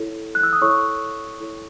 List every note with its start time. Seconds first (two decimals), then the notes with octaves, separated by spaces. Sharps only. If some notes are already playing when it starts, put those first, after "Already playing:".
Already playing: E4 A4 C#5
0.35 F#6
0.43 E6
0.53 D#6
0.62 E4 A4 C#5 C#6
1.40 E4 A4 C#5